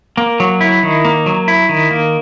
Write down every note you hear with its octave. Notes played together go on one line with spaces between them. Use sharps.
A#3
F#3
E4
D#3
A#3
F#3
E4
D#3
A#3